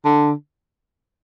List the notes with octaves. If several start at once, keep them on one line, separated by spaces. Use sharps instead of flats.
D3